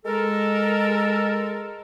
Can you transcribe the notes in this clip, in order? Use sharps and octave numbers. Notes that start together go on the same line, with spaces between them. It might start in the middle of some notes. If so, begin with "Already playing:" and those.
G#3 A4 A#4